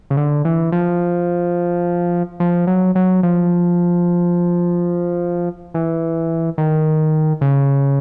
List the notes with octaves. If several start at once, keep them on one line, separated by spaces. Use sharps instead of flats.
C#3
D3
E3
F3
F3
F#3
F#3
F3
E3
D#3
C#3